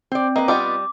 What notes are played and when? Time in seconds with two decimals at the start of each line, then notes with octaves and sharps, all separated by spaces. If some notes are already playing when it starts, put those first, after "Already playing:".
0.12 C4 C5 D5
0.36 A#3 B4 D#5
0.48 G3 B3 F4 D5 D#5 D6